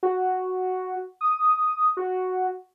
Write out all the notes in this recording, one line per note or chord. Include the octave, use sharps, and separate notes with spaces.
F#4
D#6
F#4